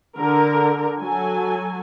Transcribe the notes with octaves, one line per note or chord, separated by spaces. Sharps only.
D3 A#4
F#3 A4 G#5